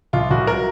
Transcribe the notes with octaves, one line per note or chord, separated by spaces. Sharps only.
C2 F4
C2 F#4
F#3 A#4